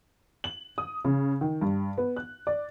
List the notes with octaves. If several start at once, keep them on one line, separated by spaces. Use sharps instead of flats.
F#7
D#6
C#3
D#3
G2
B3
F#6
D5